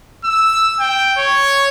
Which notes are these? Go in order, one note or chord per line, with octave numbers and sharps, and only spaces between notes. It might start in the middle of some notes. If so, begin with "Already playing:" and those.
E6
G5
C#5